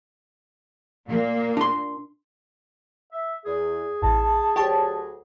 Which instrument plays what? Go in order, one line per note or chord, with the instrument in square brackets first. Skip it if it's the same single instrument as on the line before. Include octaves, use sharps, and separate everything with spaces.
[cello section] A#2 A#3
[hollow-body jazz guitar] D4 C6
[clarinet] E5
[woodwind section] E2 [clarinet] G#4
[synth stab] A1 [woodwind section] A5
[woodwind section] D2 F#3 [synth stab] G4 C#5 A5